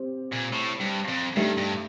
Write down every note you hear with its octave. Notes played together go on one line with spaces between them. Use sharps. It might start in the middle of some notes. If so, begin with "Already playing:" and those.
Already playing: C4 G4
A#2
A2
G2
F2
G2 A3 D#4 G4
G2